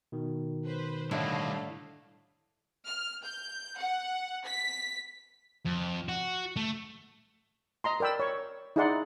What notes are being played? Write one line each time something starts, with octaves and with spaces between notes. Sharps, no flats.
B2 D#3
B4 C5
A2 D3 G3 A3 D4 E4 D#5 F5
F6
G6
F#5
B6
F2
F#4
A3
D#5 A#5 C6
A#4 D5 G5 B5 E6
C#5 C#6
D#4 E4 G#4 D5 F#5 C6